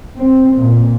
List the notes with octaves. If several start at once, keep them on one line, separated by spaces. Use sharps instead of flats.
C4
A#2